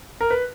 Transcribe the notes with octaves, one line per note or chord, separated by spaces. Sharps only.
A#4
B4